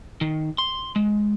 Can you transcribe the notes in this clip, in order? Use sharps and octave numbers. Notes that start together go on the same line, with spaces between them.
D#3
C6
G#3